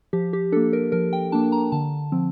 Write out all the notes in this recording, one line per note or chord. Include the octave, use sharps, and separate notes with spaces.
F3 G4
G4
A#3 D4 A4
A#4
F3 A#4
G5
A#3 D4 A5
A#5
D3 A5
F3 C4